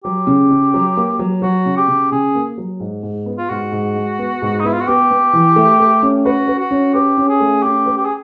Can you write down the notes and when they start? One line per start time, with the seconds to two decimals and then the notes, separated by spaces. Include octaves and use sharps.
0.04 F#3 G4
0.27 C#3
0.51 C#3
0.74 F#3
0.97 A#3
1.19 F#3
1.42 F#3 F#4
1.66 C#3
1.77 G4
1.88 C#3
2.12 C#3 G#4
2.35 A#3
2.58 F#3
2.80 G#2
3.03 G#2
3.26 B3
3.38 F4
3.49 G#2 F#4
3.72 G#2
3.96 G#3
4.19 B3
4.42 G#2
4.60 D#4
4.64 B3 E4
4.73 F4
4.81 F#4
4.88 B3 G4
5.11 B3
5.33 E3
5.56 A3
5.80 A3
6.03 C#4
6.25 F#4 B4
6.48 B4
6.59 F#4
6.71 C#4
6.94 G4 B4
7.18 C#4
7.29 G#4
7.40 A3
7.63 C#4 G4
7.86 B4
7.97 G4
8.05 G#4